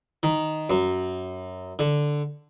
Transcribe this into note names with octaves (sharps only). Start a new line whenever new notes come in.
D#3
F#2
D3